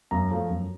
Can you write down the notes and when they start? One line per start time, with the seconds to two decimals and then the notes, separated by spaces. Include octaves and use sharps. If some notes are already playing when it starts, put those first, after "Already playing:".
0.11 F#2 A#5
0.31 F3 A3
0.50 F#2